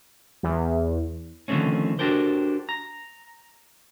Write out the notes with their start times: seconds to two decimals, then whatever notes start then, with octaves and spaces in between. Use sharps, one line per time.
0.43 E2
1.48 D3 D#3 F3 A3 C4 C#4
1.99 D4 F#4 G4 A4 A#4 C5
2.69 A#5